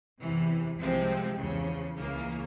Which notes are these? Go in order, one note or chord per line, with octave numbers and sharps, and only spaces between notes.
E2 C3 E3
C2 C3 F3 G#3 C4
E2 C#3 F3
C#2 C#3 E3 A#3